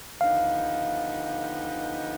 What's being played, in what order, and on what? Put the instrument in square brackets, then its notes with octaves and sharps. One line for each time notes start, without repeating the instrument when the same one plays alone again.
[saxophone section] D3 F3 B3 D#4 G4 [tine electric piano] F5